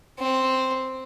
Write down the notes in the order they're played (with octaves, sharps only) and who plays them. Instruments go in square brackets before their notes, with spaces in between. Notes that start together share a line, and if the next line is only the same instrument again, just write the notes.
[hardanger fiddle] C4